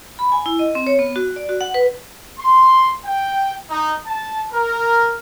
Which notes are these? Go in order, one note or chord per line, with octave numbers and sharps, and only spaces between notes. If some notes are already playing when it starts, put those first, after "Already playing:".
B5
G#5
E4
D#5
C4
C#5
B3
F#4
D5
F#4
F#5
B4
C6
G5
D#4
A5
A#4